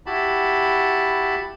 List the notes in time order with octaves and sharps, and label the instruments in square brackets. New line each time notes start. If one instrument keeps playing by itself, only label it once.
[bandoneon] E4 F#4 G4 A5 B5